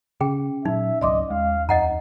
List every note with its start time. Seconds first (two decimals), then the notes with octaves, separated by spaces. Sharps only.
0.21 C#3 C#4 G#4 G5
0.65 A#2 F#3 D#4 E5
1.01 G#1 C#2 F#3 D5 D#5 C6 D6
1.30 D#2 G#3 F5
1.69 F2 D#4 D#5 F#5 A#5